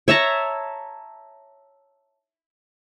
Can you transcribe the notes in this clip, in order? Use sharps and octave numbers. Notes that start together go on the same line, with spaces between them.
C#5 E5 A5 A#5